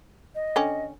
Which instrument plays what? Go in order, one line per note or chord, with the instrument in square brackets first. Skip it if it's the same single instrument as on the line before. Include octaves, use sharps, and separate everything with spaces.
[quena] D#5
[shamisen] D3 C#4 G5